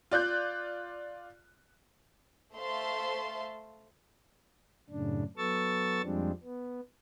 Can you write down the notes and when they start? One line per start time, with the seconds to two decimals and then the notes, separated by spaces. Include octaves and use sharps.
0.11 F4 D5 F#6 G6
2.54 A3 C5 E5 F5 A5 C6
4.90 F#2 A2 C#3 D4
5.37 F#3 B3 A4 C#6 E6 A6
6.02 F2 F3 G3 G#3 C4 D4
6.43 B3